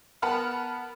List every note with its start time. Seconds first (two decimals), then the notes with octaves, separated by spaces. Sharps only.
0.22 B3 A#4 F#5 A5 B5 F6